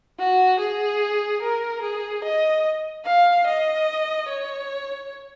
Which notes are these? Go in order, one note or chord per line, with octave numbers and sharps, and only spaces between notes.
F#4
G#4
A#4
G#4
D#5
F5
D#5
C#5